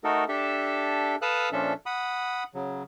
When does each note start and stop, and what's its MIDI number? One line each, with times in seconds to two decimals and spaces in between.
0.04 0.24 57
0.04 0.24 63
0.04 0.24 66
0.04 0.24 69
0.04 0.24 70
0.28 1.16 62
0.28 1.16 67
0.28 1.16 69
0.28 1.16 76
1.22 1.49 69
1.22 1.49 71
1.22 1.49 77
1.22 1.49 87
1.22 1.49 88
1.22 1.49 90
1.52 1.73 46
1.52 1.73 53
1.52 1.73 61
1.52 1.73 62
1.52 1.73 69
1.52 1.73 76
1.86 2.44 78
1.86 2.44 83
1.86 2.44 87
2.54 2.83 49
2.54 2.83 54